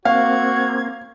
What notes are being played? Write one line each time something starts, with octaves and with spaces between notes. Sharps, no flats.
A#3 C4 F#4 F5 G#6